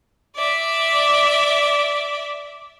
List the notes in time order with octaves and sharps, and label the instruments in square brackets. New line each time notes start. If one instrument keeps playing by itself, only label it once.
[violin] D5 E5